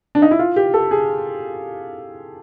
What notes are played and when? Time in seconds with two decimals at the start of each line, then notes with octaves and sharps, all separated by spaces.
0.15 D4
0.22 D#4
0.31 E4
0.39 F4
0.56 G4
0.74 A4
0.91 G#4